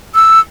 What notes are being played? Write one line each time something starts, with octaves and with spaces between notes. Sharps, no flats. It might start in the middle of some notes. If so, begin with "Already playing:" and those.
E6